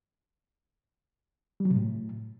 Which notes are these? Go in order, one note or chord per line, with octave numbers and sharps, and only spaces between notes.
G3
F#3
C3
A2